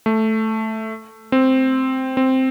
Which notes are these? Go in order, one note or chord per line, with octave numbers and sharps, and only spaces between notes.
A3
C4
C4